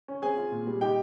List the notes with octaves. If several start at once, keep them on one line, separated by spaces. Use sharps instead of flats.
C#4
C4 G#4 G#5
F4
A#2
G3
D#4 G4 G5